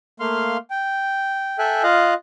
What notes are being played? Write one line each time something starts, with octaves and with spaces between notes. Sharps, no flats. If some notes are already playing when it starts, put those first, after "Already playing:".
A3 A#3 F5 C6 F6
G5
A4 E5 G5 G#5 F#6
F4 D#5 F5 F#6